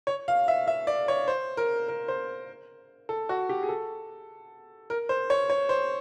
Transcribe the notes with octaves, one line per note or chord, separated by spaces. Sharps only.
C#5
F5
E5
E5
D5
C#5
C5
A#4
A#4
C5
A4
F#4
G4
G#4
A4
A#4
C5
C#5
C#5
C5